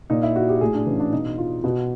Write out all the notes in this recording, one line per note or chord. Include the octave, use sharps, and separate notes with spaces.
A#2 D#4
E4
F#4
G4
A2 G#4
D4
E3 C#4
D4
B2 D#4
F4
B2 F#4